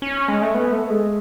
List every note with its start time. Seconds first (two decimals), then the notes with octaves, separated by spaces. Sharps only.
0.02 C#4
0.28 G#3
0.42 A3
0.55 B3
0.72 A3
0.90 G#3